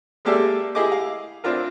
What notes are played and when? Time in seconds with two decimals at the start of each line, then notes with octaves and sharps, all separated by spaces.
0.25 G#3 A#3 G4 A4 D5 E5
0.75 E4 G4 G#4 D#5 D6
0.92 F5
1.44 C4 D4 E4 F4 A#4